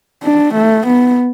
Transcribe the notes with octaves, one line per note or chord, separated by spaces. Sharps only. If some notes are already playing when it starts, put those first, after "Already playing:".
D4
A3
B3